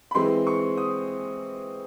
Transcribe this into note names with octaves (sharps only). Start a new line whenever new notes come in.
B5
E3 G#3 C4 C6
C#6
D#6